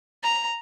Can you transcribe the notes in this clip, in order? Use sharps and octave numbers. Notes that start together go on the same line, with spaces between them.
A#5